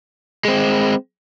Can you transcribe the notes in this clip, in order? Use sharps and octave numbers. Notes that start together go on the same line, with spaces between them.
G#3 C4